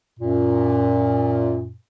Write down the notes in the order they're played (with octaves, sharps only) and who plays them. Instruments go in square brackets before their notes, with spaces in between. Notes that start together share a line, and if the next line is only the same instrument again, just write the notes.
[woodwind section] F#2 A#2